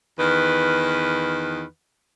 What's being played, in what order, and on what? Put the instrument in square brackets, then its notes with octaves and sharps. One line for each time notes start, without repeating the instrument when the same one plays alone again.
[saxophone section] E2 D#3 B4